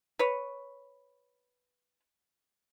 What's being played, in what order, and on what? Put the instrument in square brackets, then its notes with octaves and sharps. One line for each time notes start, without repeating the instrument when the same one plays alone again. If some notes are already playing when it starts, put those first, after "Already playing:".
[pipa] B4 C#5